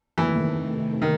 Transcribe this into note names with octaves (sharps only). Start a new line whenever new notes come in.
C3 D#3 E3 A3
D#3